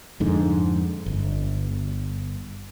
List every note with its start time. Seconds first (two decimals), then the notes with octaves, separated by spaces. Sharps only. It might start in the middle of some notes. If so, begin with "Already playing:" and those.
0.20 F2 G#2 D3
1.06 G1